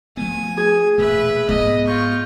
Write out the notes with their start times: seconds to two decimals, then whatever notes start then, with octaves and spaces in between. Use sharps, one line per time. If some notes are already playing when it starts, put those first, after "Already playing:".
0.17 F3 A3 B3 G#5
0.57 G#4
0.98 E1 A#2 A3 B4 E5
1.49 G#2 B3 D#5
1.87 F4 C#6 G6